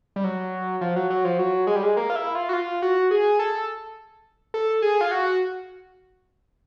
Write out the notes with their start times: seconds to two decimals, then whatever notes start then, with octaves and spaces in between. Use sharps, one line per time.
0.16 G3
0.24 F#3
0.81 F3
0.96 F#3
1.10 F#3
1.25 F3
1.39 F#3
1.67 G#3
1.76 G3
1.83 G#3
1.97 A#3
2.10 F4
2.15 E4
2.35 F4
2.49 F#4
2.53 F4
2.82 F#4
3.11 G#4
3.39 A4
4.54 A4
4.82 G#4
5.01 F4
5.11 F#4